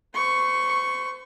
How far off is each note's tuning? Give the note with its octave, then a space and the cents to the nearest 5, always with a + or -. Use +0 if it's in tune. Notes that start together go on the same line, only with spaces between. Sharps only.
C5 -35 C#6 +0